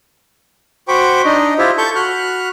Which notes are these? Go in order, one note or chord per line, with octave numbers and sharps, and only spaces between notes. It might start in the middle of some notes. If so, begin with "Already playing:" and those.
F#4 C5 G5 B5 C#6 D6
D4 D#4 D#5
E4 F4 G4 C5 E5
A4 A5 C#6 G6
F#4 B5 F6 F#6